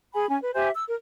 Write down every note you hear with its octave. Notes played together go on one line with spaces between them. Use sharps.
G#4 G#5 B5
C#4 G#5
B4
G4 C5 E5 G#5
E6
A#4